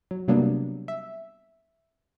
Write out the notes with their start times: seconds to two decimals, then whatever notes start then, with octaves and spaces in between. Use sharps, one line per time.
0.11 F#3
0.28 C3 F#3 G3 A#3 B3 D4
0.88 E5